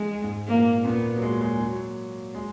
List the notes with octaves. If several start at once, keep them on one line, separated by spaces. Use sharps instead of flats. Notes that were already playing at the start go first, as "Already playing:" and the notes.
Already playing: G#3
G#2
A#2 A#3
A#2 B3
F#3
G#3
G#3
F#3
G#3